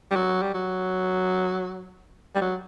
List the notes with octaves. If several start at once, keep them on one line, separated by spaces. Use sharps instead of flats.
G3
F#3
G3
F#3
G3
F#3